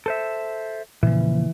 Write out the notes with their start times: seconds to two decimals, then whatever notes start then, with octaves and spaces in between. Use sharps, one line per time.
0.06 A4 C5 E5
1.03 A#2 C#3 E3 F3